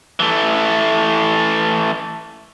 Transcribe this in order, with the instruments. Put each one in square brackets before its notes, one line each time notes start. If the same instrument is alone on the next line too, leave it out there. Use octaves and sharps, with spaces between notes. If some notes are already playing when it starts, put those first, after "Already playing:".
[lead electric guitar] E3 A3